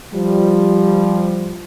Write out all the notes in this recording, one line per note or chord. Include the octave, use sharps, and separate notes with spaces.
F3 G3